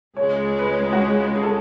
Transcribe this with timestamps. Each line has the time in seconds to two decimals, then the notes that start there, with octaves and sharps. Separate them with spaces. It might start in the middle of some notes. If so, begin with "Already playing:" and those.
0.17 C#2 C#3 G#3 C#5
0.59 B4
0.93 F#4
1.01 G#4
1.36 G#4
1.43 A4